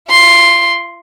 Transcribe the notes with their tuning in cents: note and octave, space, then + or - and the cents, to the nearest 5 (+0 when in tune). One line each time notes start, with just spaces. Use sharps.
F4 -40 C6 +5